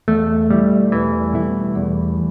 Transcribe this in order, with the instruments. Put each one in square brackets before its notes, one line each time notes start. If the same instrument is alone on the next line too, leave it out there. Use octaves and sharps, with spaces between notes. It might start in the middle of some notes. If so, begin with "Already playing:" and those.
[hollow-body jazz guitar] E2 [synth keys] A3
[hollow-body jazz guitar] B2 A3 E4 [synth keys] G3
[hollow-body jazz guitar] E2 [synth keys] E3
[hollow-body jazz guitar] B2 A3 E4
E2